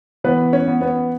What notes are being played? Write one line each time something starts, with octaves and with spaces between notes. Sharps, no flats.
E3 B3 B4
C#4 C#5
B3
B3 B4